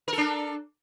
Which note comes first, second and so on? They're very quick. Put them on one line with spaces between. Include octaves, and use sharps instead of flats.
A#4 A4 D4